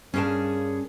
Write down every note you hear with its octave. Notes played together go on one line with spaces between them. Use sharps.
G2 C#3 C#4 G#4 A#4 C#5 A5